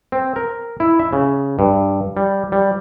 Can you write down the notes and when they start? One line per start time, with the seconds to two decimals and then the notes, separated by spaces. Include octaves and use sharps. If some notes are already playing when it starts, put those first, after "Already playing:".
0.12 C4
0.36 A#4
0.80 E4
0.99 E5
1.13 C#3
1.59 G2
2.17 G3
2.52 G3